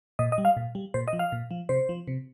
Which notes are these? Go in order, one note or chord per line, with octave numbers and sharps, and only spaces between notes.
A#2 D#5
D#5
G3
F5
A#2
G3
A#2 C5
D#5
F3
F5
A#2
F3
C3 C5
F3
C3